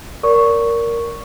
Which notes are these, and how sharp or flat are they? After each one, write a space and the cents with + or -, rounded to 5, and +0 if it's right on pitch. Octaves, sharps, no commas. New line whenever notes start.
A#4 +0 D5 -35 C#6 +0